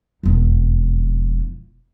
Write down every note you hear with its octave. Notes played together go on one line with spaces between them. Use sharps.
E1 F2